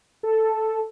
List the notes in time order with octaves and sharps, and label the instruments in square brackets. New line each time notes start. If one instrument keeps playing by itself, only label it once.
[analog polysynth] A4